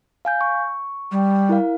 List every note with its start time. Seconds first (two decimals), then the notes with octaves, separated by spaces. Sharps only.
0.25 F5 G#5 G6
0.41 C#6
1.11 G3
1.49 E4 A#4 F5